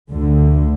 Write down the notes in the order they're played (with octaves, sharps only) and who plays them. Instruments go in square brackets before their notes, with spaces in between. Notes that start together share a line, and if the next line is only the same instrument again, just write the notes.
[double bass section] D2 D3